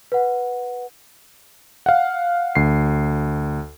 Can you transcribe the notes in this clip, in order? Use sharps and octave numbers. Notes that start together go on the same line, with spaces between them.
B4 F#5
F5 F#5
D2 C7